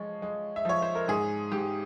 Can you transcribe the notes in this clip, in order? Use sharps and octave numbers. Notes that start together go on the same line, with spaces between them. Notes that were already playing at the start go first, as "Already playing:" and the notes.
Already playing: F3 G#3 C#5
G#3
E5
F3 C#5
C5
A#4
G#2 G#4
G#2 G4